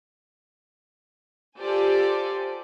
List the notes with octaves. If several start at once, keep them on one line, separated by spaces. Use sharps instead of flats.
F4 G4 A4 C5 D5 G#5